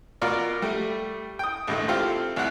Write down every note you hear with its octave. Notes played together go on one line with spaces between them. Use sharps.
B2 F4 A#4 D5
G3 A3
G5 D#6
A#1 G#2 D#3 A3
C4 E4 F4 G4 A4
C2 C3 E4 F#5 F#6